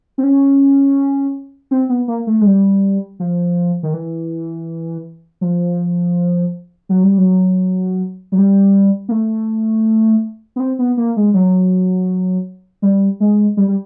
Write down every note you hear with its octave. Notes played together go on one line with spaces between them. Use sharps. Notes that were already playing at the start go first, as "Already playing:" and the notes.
C4
C#4
C4
B3
A#3
A3
G#3
G3
F3
D#3
E3
F3
F#3
G3
F#3
F#3
G3
A#3
A3
B3
C4
B3
A#3
G#3
F#3
G3
G#3
G3
G3